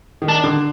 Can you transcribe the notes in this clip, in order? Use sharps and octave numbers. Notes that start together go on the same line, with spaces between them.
D#3
D4
D3